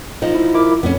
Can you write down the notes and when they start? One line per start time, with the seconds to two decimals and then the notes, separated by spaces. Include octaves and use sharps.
0.22 F3 D#4
0.35 E4
0.54 E4 A#4 D6
0.83 F2 B3 C#4